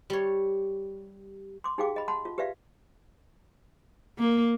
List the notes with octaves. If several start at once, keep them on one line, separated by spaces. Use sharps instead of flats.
G3 C#5
C6 D6
D#4 G4 G#4 F5 G5 D6
D#5 B5
F#5 A5 B5 C6
F4
G4 B4 D5 E5 F5
A#3